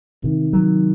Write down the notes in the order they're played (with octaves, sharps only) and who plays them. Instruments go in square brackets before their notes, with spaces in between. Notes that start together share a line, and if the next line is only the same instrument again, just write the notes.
[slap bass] C3 [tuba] D#3
[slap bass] F#3